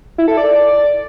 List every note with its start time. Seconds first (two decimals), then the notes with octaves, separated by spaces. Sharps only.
0.18 E4
0.28 A4
0.37 D5